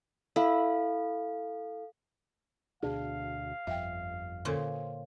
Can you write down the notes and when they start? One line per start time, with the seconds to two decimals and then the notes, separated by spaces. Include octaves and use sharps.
0.36 E4 A4 F5
2.83 D2 B2 D4 G#4 F5
3.67 G1 F2 E5 G5
4.45 A#2 D3 C#4 A4 C5